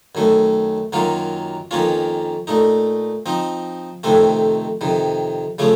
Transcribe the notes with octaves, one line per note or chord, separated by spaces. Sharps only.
F#2 D#3 A3
F#2 D#3 F#3 A#3 F4
F2 D#3 A#3 C#4 F4
A#2 A3 D#4
F3 C4 D#4
F2 C3 D#3 A3 C4
F2 C3 D#3
C#3 F3 A3 C#4